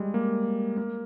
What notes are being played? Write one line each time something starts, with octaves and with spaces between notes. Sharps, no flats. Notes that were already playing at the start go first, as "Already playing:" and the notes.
Already playing: G3 G#3
A#3
A#3